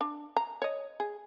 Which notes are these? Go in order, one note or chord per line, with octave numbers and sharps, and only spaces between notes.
D4
A#5
C#5 D#5
G#4